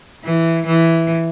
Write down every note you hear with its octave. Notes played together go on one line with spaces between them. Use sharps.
E3
E3